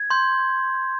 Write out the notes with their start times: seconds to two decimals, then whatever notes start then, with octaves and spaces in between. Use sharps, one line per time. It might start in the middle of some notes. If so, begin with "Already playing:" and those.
Already playing: G#6
0.10 C6 G6